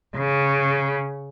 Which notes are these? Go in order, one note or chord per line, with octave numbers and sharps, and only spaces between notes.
C#3